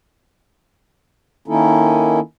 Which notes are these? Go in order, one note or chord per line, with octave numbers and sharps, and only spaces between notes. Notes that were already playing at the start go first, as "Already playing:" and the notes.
D#3 A#3 C#4 D#4 E4 A4